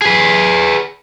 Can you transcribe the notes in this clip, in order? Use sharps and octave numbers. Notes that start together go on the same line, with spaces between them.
G#4 B4